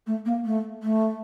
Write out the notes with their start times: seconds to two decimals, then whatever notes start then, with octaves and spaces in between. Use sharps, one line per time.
0.06 A3
0.25 A#3
0.45 A3
0.83 A3